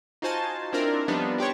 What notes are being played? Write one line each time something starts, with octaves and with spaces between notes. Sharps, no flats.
D#4 F4 F#4 C5 G#5 A5
C4 D4 E4 F4 A#4 D5
F3 G3 B3 D4 D#4
D4 G4 C5 C#5